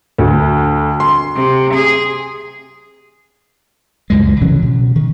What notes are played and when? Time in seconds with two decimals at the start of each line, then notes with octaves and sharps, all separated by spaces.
0.18 D2
1.00 C6
1.35 C3
1.74 G#4
4.10 C#2 F#2 G#3
4.42 C#3 E3 F#3 C#4
4.62 B2
4.96 D#3